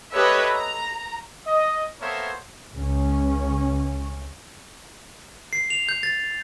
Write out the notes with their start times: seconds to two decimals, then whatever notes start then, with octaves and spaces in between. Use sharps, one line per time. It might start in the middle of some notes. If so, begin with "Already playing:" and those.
0.13 G4 A4 B4 C#5 D#5 E5
0.54 A#5
1.46 D#5
2.01 A#3 B3 A4 C5 C#5 E5
2.73 C#2 C#4
5.53 C7
5.70 F7
5.89 G6
6.03 A6